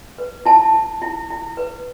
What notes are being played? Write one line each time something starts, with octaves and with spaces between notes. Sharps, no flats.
B4
E4 A5
E4
E4
E4
B4